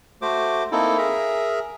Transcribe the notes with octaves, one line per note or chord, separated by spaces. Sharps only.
A3 F#4 C5 D6
A#3 C4 D#4 E4 A4
G#4 A#4 E5 A#5